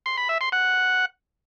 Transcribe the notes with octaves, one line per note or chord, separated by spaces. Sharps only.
C6
B5
E5
C6
F#5